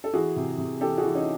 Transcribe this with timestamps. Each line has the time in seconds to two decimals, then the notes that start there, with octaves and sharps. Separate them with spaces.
0.04 A4
0.14 E3 F#4 G#4
0.36 C3
0.58 C3
0.81 E3 G4 A4
0.98 F#4 G#4
1.03 E3
1.15 C#4 D#4